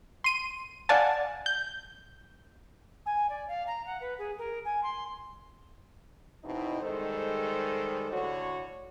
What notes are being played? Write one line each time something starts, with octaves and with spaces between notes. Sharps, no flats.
C6 D#7
D5 F5 F#5 G#5 A5
G6
G#5
D5
F5
A#5
F#5
B4
G#4
A#4
G#5
C6
E2 B2 C4 D#4 E4
D#3 G3 G#3 A4 C5
D2 A2 D3 F#4 C#5